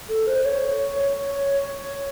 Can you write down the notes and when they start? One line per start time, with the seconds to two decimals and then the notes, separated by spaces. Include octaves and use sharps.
0.09 A4
0.27 C5
0.45 C#5